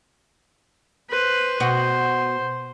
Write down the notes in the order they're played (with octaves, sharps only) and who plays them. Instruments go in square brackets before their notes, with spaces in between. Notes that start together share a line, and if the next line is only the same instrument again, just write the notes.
[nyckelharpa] B4 C5
[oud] B2 F#4 [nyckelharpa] C5